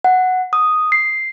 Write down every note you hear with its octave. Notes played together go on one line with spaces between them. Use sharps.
F#5
D#6
C7